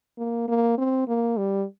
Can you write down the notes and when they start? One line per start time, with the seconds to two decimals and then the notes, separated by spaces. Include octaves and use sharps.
0.18 A#3
0.48 A#3
0.78 C4
1.08 A#3
1.37 G3